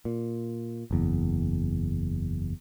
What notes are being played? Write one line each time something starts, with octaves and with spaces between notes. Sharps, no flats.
A#2
F#1 E2